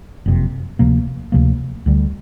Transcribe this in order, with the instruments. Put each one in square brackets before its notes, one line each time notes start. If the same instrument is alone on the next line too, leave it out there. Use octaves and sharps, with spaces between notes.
[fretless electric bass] F#1 F2 C3
D2 C3 F3 A#3
D2 C3 F3 A#3
D2 D3 G3